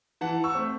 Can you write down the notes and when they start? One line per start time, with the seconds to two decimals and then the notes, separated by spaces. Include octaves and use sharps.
0.21 E3 F#5 A5
0.44 C#6 E6
0.55 A3 C4